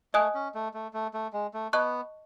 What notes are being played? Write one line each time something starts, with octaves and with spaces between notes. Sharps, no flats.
A3 D#5 G#5 D#6 F#6
C#4
A3
A3
A3
A3
G#3
A3
B3 D#5 A5 C#6 F#6